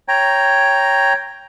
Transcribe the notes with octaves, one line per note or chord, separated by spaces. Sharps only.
C#5 G5 A#5